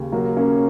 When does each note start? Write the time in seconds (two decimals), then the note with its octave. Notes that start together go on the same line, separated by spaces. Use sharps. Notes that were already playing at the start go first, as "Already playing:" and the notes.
Already playing: D#2 C#3
0.12 F#3 A#3
0.37 A#3 C#4